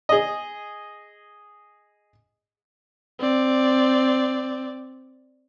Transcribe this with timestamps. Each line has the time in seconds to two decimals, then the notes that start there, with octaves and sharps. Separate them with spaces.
0.09 G#4 D#5
3.19 C4 D5